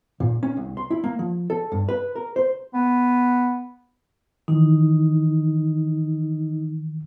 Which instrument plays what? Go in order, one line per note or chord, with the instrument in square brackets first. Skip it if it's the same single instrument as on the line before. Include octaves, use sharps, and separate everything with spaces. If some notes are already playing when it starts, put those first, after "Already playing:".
[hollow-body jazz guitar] A#2
C#4
C2
C6
E4
A#3
F3
A4
G2
B4
A#4
C5
[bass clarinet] B3
[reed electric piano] D#3 E3 [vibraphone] D#4